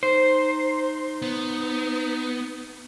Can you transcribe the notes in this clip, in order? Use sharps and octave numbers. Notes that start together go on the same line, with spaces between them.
D#4 C5
B3